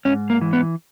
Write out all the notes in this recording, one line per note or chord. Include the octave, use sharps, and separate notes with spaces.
G#2 C#4
A#3
E3
B3